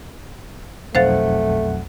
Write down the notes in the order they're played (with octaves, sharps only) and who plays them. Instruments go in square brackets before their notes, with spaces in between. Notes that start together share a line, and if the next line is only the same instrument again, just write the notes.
[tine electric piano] B1 F2 F#5 [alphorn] A3 [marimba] C5 F5 A6